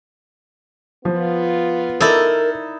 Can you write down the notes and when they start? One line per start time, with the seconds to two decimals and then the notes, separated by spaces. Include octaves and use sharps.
1.05 F3 B3 F4
2.00 D#4 E4 A4 A#4 D5